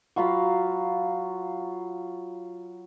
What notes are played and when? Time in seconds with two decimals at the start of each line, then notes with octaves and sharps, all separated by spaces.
0.16 F#3 F4 F5 B5